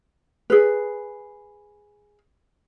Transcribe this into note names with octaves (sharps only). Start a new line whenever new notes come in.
G#4 B4